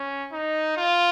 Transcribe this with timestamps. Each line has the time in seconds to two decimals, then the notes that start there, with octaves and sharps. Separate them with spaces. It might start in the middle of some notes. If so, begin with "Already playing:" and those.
Already playing: C#4
0.32 D#4
0.77 F4